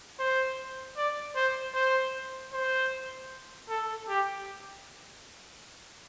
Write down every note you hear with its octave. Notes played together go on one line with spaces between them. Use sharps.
C5
D5
C5
C5
C5
A4
G4